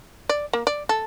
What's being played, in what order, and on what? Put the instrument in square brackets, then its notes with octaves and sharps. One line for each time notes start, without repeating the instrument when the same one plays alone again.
[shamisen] D5
A#3
D5
A4